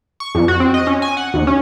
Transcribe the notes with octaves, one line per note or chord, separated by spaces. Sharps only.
C#6
F2
F#4
C4
D#5
C#4
G#5
F#5
D#2
C#4